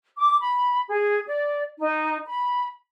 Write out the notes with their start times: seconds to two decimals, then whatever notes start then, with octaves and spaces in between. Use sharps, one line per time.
0.18 D6
0.40 B5
0.88 G#4
1.28 D5
1.80 D#4
2.27 B5